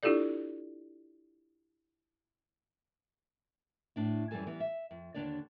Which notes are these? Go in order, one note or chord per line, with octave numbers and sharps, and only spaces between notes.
D4 E4 F4 G4 A4 D5
A2 D4 E4
F#2 E3 G3 G#4 A4 G#5
E3 G3 B3
E5
F2
D#2 D3 E3 D4 C#5 D5